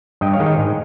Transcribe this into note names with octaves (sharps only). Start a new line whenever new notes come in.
G2 D#5 G5
C#5 F5
D#3 G#3 D#4
D#5 G5
G#2